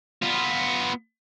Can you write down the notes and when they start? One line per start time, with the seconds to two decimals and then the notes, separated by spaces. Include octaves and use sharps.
0.22 B3 F4